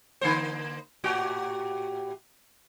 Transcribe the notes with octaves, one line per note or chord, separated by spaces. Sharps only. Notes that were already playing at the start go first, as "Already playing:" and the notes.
D3 A#3 C5
A2 F#4 G4